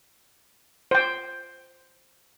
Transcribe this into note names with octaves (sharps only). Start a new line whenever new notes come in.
C5 G5